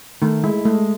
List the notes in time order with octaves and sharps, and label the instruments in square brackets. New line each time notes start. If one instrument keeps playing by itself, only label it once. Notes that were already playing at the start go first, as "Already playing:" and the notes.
[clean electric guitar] D#3 [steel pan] A3
[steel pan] G#3 [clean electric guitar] E4
[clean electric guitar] G#3 [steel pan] A3